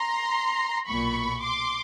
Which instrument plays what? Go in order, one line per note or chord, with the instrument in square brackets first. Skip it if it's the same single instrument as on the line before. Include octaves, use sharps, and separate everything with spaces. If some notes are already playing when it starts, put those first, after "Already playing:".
Already playing: [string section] A#5 C6
B1 A#2 B5 C#6
C6 D6